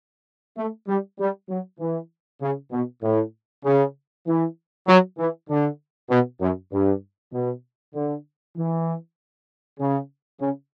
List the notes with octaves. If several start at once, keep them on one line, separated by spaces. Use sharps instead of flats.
A3
G3
G3
F#3
E3
C#3
B2
A2
C#3
E3
F#3
E3
D3
B2
F#2
G2
B2
D3
E3
C#3
C#3